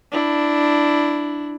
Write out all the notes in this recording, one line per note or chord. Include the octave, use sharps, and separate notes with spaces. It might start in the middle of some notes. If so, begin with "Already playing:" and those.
D4 E4